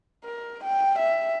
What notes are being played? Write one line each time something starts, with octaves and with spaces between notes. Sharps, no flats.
A#4
G5
E5